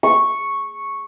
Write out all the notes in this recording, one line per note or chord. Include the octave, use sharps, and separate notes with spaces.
C#6